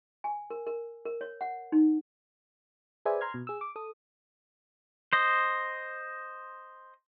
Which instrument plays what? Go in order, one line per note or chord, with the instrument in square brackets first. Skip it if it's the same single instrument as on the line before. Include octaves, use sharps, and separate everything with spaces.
[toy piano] G#5
A#4
A#4
A#4
C#5
F#5
D#4
[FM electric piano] G#4 B4 C5 D5 E5 G#5
A#5 C6 F6 G#6
B2
G#4 E6
D6
A4 D#6
[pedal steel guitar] C5 D#5